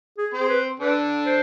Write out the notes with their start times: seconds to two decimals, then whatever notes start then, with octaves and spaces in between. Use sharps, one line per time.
0.18 G#4
0.34 C4 C5
0.40 G#4
0.49 B4
0.80 D3 D4 B4
1.26 C5